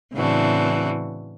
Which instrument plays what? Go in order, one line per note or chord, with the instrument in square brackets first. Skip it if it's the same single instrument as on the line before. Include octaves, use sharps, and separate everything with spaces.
[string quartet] A2 C#3 E3 C4 D4 F#4